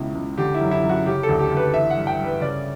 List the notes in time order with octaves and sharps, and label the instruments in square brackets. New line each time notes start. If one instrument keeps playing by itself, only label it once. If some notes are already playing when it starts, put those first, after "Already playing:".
Already playing: [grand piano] C#2 B2 E4
C#2
D3 G4
E4
F#2
E4
F#2
F#4
C#3 G4
A4
D2
G4
D2
B4
E3 E5
F#5
G2
G5
G2
B4
C#3 D5